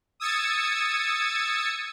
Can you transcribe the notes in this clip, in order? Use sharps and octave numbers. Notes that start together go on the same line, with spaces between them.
D#6 E6 G#6 A6 C#7